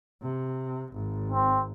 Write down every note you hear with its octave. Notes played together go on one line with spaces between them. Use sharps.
C3
G#1
C4